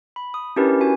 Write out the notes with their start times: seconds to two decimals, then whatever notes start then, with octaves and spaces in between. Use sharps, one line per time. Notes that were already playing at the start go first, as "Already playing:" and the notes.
0.16 B5
0.34 D#6
0.56 C#4 D4 E4 G4 A#4 B4
0.80 C#4 F#4 G#5